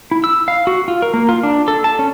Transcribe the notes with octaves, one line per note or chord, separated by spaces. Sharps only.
E4
E6
F5
F#4
F4
A#4
A#3
F4
D4
A4
A5
C#4